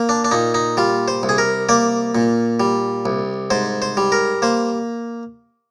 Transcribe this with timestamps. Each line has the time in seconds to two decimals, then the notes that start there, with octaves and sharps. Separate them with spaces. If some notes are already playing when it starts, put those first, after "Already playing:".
Already playing: A#3
0.09 D4
0.25 D4
0.31 A#2 D#4
0.54 D#4
0.77 G3 F4
1.08 C5
1.23 C2
1.29 G#4
1.38 A#4
1.69 A#3 D5
2.15 A#2
2.60 G3
3.06 C2
3.51 G#2 C5
3.82 C5
3.97 G3
4.12 A#4
4.42 A#3 C5